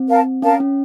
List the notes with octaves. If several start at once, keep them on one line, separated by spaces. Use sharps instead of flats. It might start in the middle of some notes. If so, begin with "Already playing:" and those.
Already playing: C4
A#4 F5 A5
C#4 A#4 F5 A5
C#4